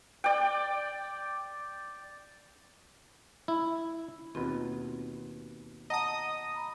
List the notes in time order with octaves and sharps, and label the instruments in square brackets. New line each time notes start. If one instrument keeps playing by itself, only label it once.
[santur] D5 G5
[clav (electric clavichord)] E4
[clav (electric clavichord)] D#2 B2 [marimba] C4 F4 B5
[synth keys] D#5 D#6 [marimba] F#5 A5 A#5
[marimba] A#5 B5